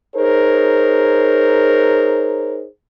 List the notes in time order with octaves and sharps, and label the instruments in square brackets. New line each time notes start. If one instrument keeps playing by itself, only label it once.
[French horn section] D#4 G#4 A#4 C5 C#5